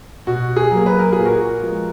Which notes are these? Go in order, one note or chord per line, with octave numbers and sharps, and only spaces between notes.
B2 F#4
G#4
F#3
A#3
B4
A#4
A#2 G#4
F#4 A#4
F3 G#3 B3